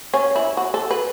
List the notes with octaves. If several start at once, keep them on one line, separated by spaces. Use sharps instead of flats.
C#4
E4
F#4
A4
B4